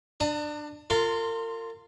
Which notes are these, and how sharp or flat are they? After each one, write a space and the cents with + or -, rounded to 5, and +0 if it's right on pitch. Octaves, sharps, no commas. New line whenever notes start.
D4 +20 A5 +45 D#6 +0
F4 +0 A#4 -40 C6 -10